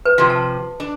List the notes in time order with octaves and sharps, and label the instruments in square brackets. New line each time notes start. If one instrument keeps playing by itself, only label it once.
[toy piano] B4
[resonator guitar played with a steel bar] C3 F3
[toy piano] A5
[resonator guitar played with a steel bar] D4